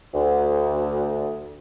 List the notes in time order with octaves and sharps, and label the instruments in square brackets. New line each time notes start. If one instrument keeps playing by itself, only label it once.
[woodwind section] D2